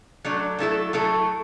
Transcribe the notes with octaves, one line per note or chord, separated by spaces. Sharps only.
F#3 A3 D4
F#3 A3 E4 A4
F#3 A3 E4 A4